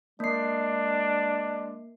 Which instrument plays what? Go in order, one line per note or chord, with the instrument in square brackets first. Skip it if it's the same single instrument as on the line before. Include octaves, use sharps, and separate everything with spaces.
[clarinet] G#3 [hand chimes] A#3 C7 [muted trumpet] D4